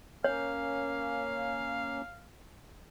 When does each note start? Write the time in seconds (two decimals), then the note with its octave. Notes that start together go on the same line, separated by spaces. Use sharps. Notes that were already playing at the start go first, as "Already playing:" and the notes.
0.24 A#3 C#4 C#5 F5